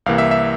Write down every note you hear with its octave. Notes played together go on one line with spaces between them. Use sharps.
C2 C3 E3 A#3 F5
E5
E5